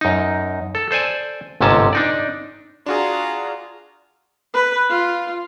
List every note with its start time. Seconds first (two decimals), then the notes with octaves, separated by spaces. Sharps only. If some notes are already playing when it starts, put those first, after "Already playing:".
0.01 F#2 D#4
0.75 A4
0.91 A4 C5 D5 G#5
1.61 G1 G#2 C3 C#4 A5
1.93 D4 D#4 D5
2.86 D4 F4 F#4 G#4 A#5
4.53 B4
4.90 F4